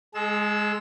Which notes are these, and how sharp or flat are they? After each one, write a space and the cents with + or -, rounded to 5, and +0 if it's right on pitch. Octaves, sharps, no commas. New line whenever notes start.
G#3 +5 G#4 +45 E6 -5